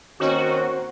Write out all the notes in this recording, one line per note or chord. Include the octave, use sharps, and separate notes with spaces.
D#3 A#3 C4 C#4 F#4 C5